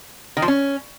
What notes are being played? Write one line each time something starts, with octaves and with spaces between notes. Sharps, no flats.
D#3
F3
C#4